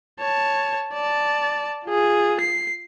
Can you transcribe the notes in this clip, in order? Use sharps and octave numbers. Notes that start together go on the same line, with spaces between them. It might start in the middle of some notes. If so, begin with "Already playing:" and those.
C#5 A5
D5 A5
F4 G#4
C7